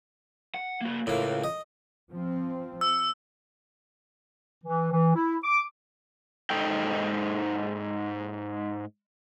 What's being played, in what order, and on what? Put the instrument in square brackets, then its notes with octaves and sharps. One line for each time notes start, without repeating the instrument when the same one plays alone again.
[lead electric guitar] F#5
A#3 F#4
[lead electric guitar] C#2 [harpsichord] A2 A#3
[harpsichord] D#5
[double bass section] F3 C4
[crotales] E6
[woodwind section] E3
E3
E4
D6
[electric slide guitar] G#2 D#4 A4 G5